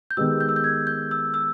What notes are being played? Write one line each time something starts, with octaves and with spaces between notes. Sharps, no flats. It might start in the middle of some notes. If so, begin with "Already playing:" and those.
G6
D#3 G#3 B3 G4 E6
G6
E6
G6
G#6
G6
E6
E6